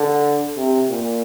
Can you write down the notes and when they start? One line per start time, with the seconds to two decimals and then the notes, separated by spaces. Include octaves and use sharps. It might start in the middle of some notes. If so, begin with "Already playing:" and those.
Already playing: D3
0.57 C3
0.90 A#2